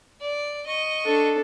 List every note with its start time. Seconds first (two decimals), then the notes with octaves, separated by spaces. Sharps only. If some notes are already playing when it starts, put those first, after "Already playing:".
0.21 D5
0.67 D#5 C#6
1.05 D4 A4